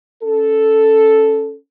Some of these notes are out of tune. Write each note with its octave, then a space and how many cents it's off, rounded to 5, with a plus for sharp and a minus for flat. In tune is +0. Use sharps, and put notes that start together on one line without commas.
C#4 +0 A4 +0